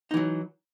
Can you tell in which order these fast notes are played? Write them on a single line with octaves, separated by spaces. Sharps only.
D#4 E3 F#3